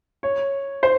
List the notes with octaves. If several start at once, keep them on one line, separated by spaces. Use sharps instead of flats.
C#5
C5